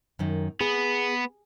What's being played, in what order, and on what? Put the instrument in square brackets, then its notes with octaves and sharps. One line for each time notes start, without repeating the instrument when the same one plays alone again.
[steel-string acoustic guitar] F#2 D#3
[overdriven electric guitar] B3 [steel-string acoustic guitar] G#4